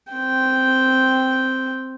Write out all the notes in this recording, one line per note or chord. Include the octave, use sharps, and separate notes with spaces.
C4 G5